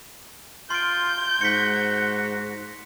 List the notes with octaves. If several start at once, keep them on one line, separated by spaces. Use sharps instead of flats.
F4 C6 G6 D7
G#2 F#4 B6 C#7